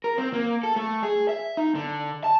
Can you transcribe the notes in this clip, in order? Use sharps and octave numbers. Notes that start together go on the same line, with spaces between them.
A#4
C4
A#3
A4
A3
G#4
E5
D#4
D3
A5